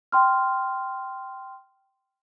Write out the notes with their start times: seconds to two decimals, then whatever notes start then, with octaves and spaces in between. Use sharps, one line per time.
0.12 G5 C6 F6